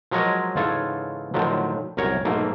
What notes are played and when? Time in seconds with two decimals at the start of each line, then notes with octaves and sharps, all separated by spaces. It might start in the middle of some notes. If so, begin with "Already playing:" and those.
0.11 F3 F#3 G#3 A#4 C#5 D#5
0.56 G#2 C#3 E3 F4 A4 C#5
1.34 A2 D3 D#3 F3 F#3
1.97 C2 F#2 A#4 C#5
2.25 B1 G#2 A3 A#3